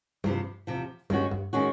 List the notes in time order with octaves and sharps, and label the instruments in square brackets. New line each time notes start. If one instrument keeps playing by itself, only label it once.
[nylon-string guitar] E2 C3 F3 [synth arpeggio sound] G2
[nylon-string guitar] E2 C3 F3
[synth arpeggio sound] G2 [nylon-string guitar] D#3 G#3 C#4 F#4
[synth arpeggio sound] G2
[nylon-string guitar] D#3 G#3 C#4 F#4